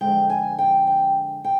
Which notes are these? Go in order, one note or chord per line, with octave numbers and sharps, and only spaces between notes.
F2 D3 G#3 G5
G#5
G5
G5
G5